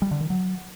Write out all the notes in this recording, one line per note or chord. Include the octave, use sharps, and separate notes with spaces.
G3
D3
D#3
F#3